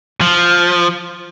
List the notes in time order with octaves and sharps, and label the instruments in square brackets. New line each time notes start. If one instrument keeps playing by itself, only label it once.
[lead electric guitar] F3